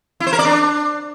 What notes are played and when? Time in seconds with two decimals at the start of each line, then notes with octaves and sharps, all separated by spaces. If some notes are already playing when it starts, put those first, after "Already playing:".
0.20 E4
0.27 C5
0.33 A#4
0.39 D5
0.45 D4